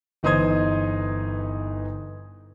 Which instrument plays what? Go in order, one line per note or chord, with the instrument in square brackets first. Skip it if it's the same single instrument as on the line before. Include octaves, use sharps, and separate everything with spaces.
[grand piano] G1 E3 D#4 C5 D#6 G#6